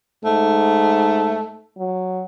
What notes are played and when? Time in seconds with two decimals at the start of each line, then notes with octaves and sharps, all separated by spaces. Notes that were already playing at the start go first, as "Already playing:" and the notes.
0.24 G#2 A3
1.78 F#3